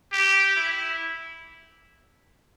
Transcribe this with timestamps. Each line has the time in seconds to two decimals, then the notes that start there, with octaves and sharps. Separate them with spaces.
0.13 G4
0.56 E4